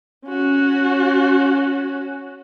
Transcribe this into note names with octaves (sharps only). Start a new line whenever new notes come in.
C#4 F#4